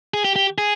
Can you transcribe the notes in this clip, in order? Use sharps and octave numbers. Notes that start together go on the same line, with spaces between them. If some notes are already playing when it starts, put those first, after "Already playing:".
G#4
G4
G4
G#4